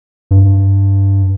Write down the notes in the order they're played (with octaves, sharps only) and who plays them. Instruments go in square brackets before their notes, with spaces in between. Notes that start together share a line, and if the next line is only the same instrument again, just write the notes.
[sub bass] G2